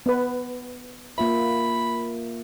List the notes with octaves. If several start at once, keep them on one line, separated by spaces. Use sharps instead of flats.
B3 B4
A#3 F4 E5 B5